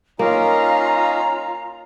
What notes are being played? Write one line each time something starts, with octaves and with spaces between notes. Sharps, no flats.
A#3 C#4 D#4 F4 A#5